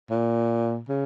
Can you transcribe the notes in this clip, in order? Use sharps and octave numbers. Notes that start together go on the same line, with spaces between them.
A#2
C#3